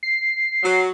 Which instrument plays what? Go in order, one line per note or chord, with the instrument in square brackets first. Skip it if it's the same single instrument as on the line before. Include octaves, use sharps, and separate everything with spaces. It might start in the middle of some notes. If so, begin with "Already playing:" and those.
[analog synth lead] C7
[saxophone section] F#3